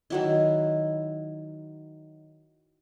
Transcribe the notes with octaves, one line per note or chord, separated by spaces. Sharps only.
D#3 F#3 E4